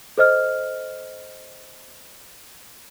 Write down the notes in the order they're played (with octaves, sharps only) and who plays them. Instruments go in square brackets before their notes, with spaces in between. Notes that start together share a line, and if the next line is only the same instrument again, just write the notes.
[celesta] A4 C5 D#5 F6